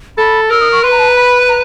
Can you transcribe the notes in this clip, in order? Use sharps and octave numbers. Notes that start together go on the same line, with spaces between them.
A4 B5
A#4 E6
D#6
C#6
B4 C6
A#5
A5
A#5
B5
A#5